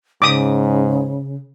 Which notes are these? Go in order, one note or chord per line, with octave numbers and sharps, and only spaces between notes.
G#2 C#3 D6 D#6